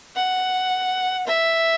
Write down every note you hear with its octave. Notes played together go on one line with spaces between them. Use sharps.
F#5
E5